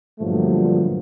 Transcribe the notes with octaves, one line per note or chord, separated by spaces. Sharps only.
G2 A#2 D3 F3 F#3 A3